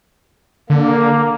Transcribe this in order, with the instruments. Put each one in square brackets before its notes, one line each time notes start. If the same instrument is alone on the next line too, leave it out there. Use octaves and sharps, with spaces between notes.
[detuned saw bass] D3 [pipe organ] A#3